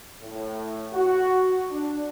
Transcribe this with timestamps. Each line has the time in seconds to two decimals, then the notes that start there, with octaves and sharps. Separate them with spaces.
0.23 A2
0.93 F#4
1.71 D4